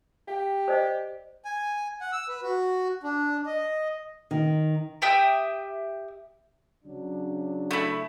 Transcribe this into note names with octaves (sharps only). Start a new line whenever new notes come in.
G4 F5
C5 D5 D#5
G#5
F#5
E6
B4
F#4
D4
D#5
D#3
G4 E5 G5 D#6
C#3 F#3 D4
A3 E4